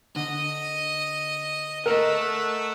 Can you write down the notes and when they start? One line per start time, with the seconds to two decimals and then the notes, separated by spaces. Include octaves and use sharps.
0.16 D3 D#5
1.86 A3 A#4 D#5 F#5 E6 F#6